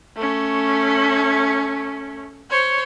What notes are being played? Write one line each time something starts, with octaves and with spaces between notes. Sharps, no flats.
A3 C#4
C5 C#5